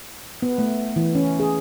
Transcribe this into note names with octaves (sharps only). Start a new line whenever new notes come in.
B3
A3
E3
C#4
G#4